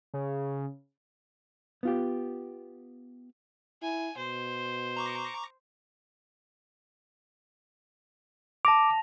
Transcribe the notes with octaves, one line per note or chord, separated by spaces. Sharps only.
C#3
B3 F4 G4
E4 G#5
B2 C5
A#5 C#6 D6
A5 D6 A#6 F7